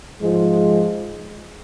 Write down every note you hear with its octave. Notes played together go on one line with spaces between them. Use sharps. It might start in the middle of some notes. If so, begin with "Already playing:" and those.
G#2 F3 G#3